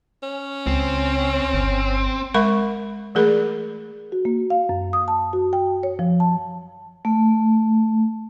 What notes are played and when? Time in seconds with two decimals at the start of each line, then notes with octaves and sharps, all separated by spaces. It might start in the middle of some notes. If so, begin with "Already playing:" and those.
0.23 C#4
0.67 C#2 C4
1.54 G1
2.34 G#3 A#4 E5 B5 C#6
3.15 E3 A3 G#4 A#4 D5 B5
4.12 F#4
4.25 A#3
4.50 F5
4.69 F#2
4.93 D#6
5.08 A5
5.33 F#4
5.53 G5
5.83 C#5
5.99 F3
6.20 A5
7.05 A3